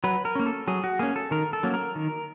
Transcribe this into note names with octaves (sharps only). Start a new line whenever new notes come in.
F#3 B4
A#4
A#3 C#4
A4
F#3 G#4
F#4
A#3 C#4 G#4
A4
D#3 A#4
A4
F#3 A#3 C#4
A#4
D#3